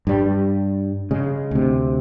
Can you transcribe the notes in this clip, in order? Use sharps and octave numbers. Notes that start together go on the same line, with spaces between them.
G2 G3
C#3 G#3
D2 C3